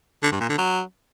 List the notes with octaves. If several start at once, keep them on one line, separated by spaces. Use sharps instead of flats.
D3
G2
A#2
D3
F#3